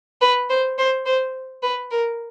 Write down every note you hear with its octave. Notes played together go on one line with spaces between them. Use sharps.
B4
C5
C5
C5
B4
A#4